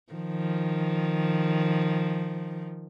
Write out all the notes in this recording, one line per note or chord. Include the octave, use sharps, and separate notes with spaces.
D#3 F3